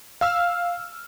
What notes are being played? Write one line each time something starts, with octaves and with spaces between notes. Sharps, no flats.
F5 E6 F6